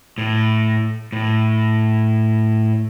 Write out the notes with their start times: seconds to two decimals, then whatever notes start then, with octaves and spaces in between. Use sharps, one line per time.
0.18 A2
1.12 A2